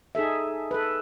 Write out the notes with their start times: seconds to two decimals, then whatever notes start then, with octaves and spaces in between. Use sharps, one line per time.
0.15 D#4 G#4 A4 E5
0.71 A4 B4